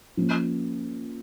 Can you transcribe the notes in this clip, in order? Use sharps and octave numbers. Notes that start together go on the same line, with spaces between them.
F3 A#3 C#4